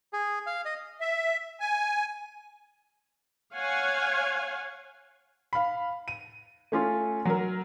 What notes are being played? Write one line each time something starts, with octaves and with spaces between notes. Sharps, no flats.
G#4
F5
D#5
E5
G#5
C#5 F5 F#5 G#5
F5 B5
D#7
A3 C#4 F4
F#3 A#4